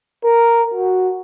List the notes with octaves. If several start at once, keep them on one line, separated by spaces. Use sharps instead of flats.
A#4
F#4